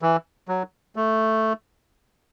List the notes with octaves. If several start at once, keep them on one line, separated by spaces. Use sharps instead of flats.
E3
F#3
A3